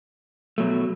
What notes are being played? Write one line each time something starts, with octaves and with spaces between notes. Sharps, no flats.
B2 F#3 A3